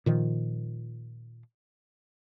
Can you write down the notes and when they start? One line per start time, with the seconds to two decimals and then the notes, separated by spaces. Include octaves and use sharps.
0.06 A#2 D#3 F3